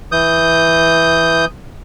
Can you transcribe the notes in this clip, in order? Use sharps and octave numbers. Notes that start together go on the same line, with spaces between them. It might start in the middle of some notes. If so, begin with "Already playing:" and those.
E3 D#6 G6